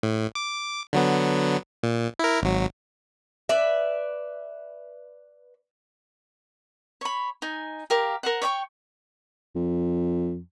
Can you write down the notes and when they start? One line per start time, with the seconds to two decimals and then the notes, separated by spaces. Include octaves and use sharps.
0.03 A2
0.35 D6
0.93 D3 F#3 B3
1.83 A#2
2.19 E4 A#4
2.42 G#1 F#3
3.49 B4 D5 E5
7.01 C#5 B5
7.42 D#4 G#5
7.90 G4 A#4 F5
8.23 A#4 C5 F#5
8.42 C#5 D5 G5 C#6
9.56 F2